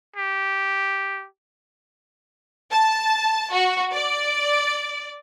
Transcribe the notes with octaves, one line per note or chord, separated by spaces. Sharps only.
G4
A5
F#4
D5